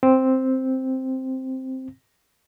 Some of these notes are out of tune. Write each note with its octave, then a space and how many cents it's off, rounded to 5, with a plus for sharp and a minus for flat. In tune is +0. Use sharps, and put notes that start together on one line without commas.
C4 +0